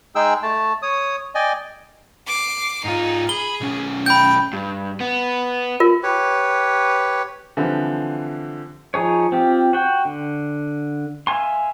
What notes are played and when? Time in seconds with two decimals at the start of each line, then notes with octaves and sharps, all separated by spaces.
0.15 G#3 D#4 G#4 G5 E6
0.43 A3 A5
0.82 C#5 D#6
1.35 D5 D#5 G5 G#5
2.27 D6 C7
2.85 G#2 D#4 F4
3.29 G#4 B5 G7
3.61 B1 C#4
4.06 G5 B5 G6
4.53 G2
5.00 B3
5.80 F4 A#4
6.03 G4 B4 C#5
7.57 D3 E3 F3 G3 C4
8.94 F3 D#4 G#4 C#5
9.32 C4 F4 G4
9.73 F#4 G5
10.05 D3
11.27 E5 F5 G#5 C6